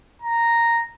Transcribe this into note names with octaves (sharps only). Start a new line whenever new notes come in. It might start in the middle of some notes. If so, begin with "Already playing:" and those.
A#5